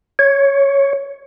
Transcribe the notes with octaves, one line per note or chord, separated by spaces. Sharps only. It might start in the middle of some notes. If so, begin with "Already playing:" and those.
C#5